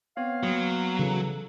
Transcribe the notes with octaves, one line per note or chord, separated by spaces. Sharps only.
B3 C4 C#5 F5
F#3 A#3 B3
C#3 E3 A4